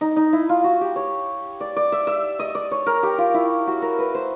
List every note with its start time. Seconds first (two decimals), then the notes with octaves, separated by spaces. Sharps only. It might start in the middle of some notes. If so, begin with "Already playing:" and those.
0.01 D#4
0.16 D#4
0.33 E4
0.49 F4
0.64 F#4
0.81 G4
0.96 C#5
1.61 D5
1.76 D5
1.92 E5
2.07 E5
2.39 D#5
2.55 D5
2.71 C#5
2.86 A#4
3.03 G4
3.18 F4
3.34 E4
3.67 F#4
3.82 A#4
3.98 B4
4.15 C5